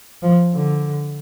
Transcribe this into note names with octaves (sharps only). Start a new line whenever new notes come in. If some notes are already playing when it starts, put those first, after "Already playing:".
F3
D3